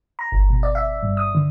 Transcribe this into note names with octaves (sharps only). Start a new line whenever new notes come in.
A#5
G1
B2
D5
E5
G2
D#6
D3